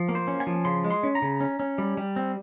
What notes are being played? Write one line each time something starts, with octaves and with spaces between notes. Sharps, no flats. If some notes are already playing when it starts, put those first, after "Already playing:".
Already playing: F3
A#3
C5
C#4
G#5
F3
C#3 C6
G#3
C6
C#4
A#5
C#3
C#4
C#4
G3
G3
C4